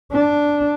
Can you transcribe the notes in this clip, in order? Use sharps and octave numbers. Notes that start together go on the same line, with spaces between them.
D4